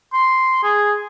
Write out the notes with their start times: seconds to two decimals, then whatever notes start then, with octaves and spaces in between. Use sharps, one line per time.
0.13 C6
0.63 G#4